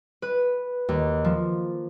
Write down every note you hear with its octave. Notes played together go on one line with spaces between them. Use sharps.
B4
D#2
F3